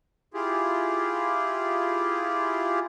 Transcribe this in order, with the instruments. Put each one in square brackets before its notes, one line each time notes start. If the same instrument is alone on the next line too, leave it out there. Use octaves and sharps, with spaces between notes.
[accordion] E4 F4 G4 G#4